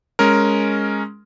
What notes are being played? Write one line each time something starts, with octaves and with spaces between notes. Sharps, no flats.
G#3 C#4 A#4